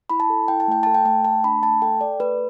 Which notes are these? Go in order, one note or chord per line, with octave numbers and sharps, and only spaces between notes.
E4 B5
A5
A4
E4 G5
A5
A3 G5
A4 A5
G5
A3 G5
A3 A5
D4 B5
A3 A5
A4 G5
A4 D5
A3 B4